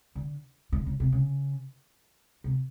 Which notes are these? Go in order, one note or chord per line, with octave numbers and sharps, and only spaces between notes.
D3
D3
C#3
C3
C#3
C3